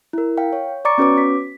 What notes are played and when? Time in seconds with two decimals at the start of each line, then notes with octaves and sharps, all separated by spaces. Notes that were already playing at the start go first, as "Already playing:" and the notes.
0.13 E4 A#4
0.38 F5 G5
0.53 C#5
0.85 D5 A#5 C#6 D6 A6 C#7
0.98 B3 C#4 F#4 B4 C#5 D6
1.18 B6